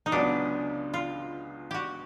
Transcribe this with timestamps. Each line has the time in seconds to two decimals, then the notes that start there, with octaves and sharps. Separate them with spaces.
0.06 D#4
0.12 C#2 C#3 F#3 B3 D4
0.94 F4
1.71 F#4 G4